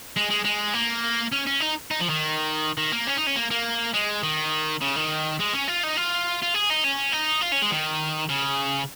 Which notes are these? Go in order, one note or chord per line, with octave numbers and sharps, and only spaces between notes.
G#3
G#3
G#3
A#3
C#4
C#4
D#4
D#4
F3
D#3
D#3
A#3
C#4
D#4
C#4
A#3
A#3
G#3
D#3
C#3
D#3
G#3
C#4
F4
D#4
F4
F4
G#4
D#4
C#4
D#4
F4
C#4
G#3
D#3
C#3